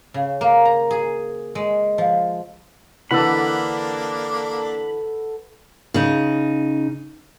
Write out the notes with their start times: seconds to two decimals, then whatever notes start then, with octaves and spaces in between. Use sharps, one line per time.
0.14 C#3
0.41 A#3
0.65 A#5
0.91 G#4
1.55 G#3
1.98 F3
3.11 D3 E3 A#3 D4 A4 B4 F#5 B5
5.94 C#3 D#4